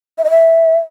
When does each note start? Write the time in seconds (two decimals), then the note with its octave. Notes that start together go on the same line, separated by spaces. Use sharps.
0.18 E5
0.24 D#5
0.30 E5